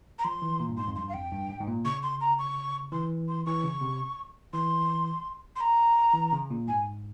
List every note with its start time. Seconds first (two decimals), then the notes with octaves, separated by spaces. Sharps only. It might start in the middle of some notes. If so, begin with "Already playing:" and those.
0.19 A#5
0.24 F3 C6
0.42 E3
0.60 A#2
0.69 G2
0.77 G#2 C6
0.88 F2
0.96 G2 C6
1.09 F5
1.14 F2 G5
1.31 G2
1.49 G#2
1.60 G#2
1.68 A#2
1.85 C#3 C#6
2.03 C6
2.21 A#5
2.39 C#6
2.92 E3 C6
3.28 C6
3.46 E3 C#6
3.64 C#3
3.81 C3
4.53 E3 C6
5.56 C6
5.61 A#5
6.14 E3
6.33 C#3
6.50 A#2
6.68 G#2 G#5